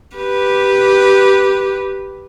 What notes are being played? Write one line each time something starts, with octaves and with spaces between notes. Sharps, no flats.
G4 B4